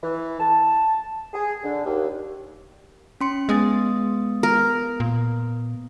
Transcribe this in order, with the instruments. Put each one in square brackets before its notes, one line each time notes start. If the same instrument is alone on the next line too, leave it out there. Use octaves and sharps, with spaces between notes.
[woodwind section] E3
A5
G#4
D3
D#2
[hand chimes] C#4 C6 C#7
[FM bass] G#3 [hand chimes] B3 D#6 A6
[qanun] A#4
[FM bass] A#2